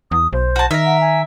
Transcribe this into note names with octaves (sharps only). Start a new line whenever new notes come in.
E2 D#6
B1 C5
F#4 A5
D#3 A#4 E5
F#5
G#5